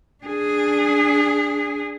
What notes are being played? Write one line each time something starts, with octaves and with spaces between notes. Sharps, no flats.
D4 G#4